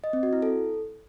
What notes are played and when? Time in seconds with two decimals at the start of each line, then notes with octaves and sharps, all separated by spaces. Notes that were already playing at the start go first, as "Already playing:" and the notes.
0.04 D#5
0.13 C4
0.23 F#4
0.33 E4
0.42 A4